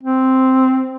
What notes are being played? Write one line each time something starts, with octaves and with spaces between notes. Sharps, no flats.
C4